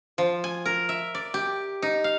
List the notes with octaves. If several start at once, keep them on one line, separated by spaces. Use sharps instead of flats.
F3
G#5
A#4
E5
D5
G4
D#4
F5